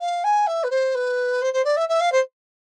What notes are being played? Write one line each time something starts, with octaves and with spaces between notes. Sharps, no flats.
F5
G#5
E5
B4
C5
B4
C5
C5
D5
E5
E5
F5
C5